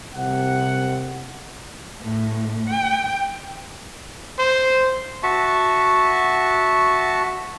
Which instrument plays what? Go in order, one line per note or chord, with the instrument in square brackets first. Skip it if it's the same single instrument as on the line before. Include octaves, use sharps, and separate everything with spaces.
[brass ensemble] C2 C3 F#5
[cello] A2
G5
[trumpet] C5
[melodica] F#4 E5 A5 C#6